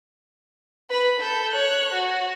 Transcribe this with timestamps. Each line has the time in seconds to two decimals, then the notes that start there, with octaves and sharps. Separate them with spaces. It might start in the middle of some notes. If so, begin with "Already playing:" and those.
0.90 B4 B5
1.20 A4 G6
1.53 C#5 F#6
1.94 F#4